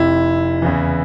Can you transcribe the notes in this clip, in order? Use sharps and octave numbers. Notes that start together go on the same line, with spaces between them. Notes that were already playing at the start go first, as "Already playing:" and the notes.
Already playing: F1 F2 C3 E4
E2 C#3 E3